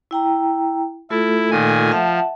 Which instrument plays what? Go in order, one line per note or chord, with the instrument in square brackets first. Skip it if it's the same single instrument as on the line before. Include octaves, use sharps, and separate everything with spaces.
[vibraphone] E4 G5 A#5
[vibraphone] A3 F4 A4 [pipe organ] E4
[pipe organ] A#2 D#3 G#5
[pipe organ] F3 [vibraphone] E5 F#5 A5